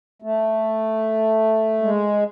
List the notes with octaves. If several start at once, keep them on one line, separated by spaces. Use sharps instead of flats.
A3
G#3